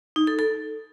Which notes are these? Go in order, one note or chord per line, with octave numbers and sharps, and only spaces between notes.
D#4
A4
A4